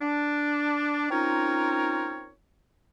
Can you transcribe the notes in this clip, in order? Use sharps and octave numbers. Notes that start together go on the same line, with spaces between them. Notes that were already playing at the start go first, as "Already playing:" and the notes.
D4
C4 C#4 D#4 F4 A#4 C#5